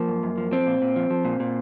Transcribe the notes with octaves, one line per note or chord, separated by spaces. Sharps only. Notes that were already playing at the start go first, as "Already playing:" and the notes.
Already playing: F3 A#3
F#2
F#2
F3
F3 C4
A#2
A#2
F3
F3
A#2
A#2